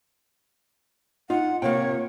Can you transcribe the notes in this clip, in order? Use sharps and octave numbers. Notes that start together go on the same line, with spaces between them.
D#4 F4 F#5
C3 A#3 F4 C#5 F5 G5